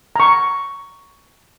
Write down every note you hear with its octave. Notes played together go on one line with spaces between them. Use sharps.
A#5 C#6